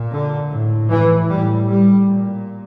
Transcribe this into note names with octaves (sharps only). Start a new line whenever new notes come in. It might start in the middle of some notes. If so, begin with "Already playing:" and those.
Already playing: A#2
D3
A2
E3
A2 G3
G3
A#2